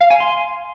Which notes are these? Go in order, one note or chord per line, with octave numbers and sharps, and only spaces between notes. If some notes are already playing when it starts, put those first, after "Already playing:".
F5
G#5
C6